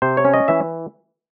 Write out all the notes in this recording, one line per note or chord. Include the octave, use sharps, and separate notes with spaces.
C3 C5
C#5
C#4
D#5
E3 E5